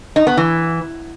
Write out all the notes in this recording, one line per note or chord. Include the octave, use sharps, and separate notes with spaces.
D#4
B3
E3